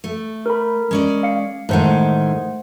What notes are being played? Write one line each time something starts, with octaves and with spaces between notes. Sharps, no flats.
A3
A#4 B5
G#3 C#4 D5
F5 C#7
A2 D#3 G#3 A3 C5 F#5